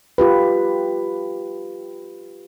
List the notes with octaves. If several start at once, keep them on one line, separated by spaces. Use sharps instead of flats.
F4 G4 B4